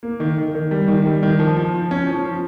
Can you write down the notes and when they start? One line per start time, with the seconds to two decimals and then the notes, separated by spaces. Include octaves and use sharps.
0.03 A#3
0.20 D#3
0.38 D#3
0.55 D#3
0.71 G3
0.88 D#3
1.06 G3
1.23 D#3
1.39 F3
1.57 F3
1.74 F3
1.91 C#4
2.07 F3
2.24 F3